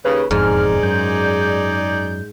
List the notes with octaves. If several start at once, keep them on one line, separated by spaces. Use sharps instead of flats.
D#2 C#3 B4
E1 F2 G#2 D#4 G#4 D5 F6
F#2 G6